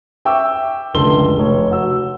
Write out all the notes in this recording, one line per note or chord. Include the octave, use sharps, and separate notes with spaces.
E5 G5 C#6 D6 E6
F1 C#2 D3 A4 C6 G7
F1 C#5
F#4 E6